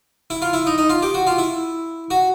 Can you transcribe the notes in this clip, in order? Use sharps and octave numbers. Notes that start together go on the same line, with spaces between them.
E4
F4
E4
D#4
D#4
F4
G4
F#4
F4
E4
F#4